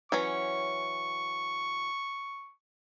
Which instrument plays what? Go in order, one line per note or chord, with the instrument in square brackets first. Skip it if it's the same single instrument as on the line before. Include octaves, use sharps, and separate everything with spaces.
[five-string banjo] E3 F#3 C#4 [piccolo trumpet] C#6